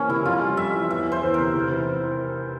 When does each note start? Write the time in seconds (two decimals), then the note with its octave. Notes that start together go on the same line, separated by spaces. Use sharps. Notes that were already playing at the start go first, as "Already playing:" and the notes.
Already playing: C#2 E3 A#3 C#4
0.09 C3 E4
0.25 F2 F4
0.42 G3
0.57 F2 E5
0.74 E3
0.90 E2 E5
1.07 E3
1.12 C5
1.23 E2
1.34 A#4
1.39 C3
1.55 F1
1.71 E3